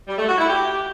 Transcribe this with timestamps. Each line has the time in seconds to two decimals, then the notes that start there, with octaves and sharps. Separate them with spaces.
0.08 G3
0.18 A3
0.28 F#4
0.38 E4
0.48 G4